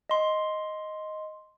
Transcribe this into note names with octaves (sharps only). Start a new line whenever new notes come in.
D#5 C6